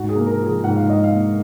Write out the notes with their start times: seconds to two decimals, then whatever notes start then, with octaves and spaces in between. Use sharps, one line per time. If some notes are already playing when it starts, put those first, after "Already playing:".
Already playing: G#2 F#4
0.09 G#4
0.16 A#3
0.27 A#4
0.40 F3
0.45 G#4
0.63 G#2 F#5
0.76 F5
0.87 G#2 D#5
1.04 F5
1.12 A#3